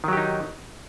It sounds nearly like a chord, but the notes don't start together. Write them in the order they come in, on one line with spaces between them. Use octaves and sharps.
D#3 F#3 G4 D#4